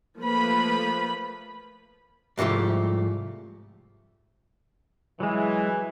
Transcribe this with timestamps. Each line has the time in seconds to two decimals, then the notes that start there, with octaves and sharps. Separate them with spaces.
0.19 F3 A3 A#3 B4 B5
2.38 C2 G#2 F3 A3 G4
5.20 E3 F#3 G#3